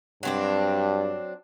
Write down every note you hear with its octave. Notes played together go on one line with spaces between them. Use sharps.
G2 F#3 C4 D4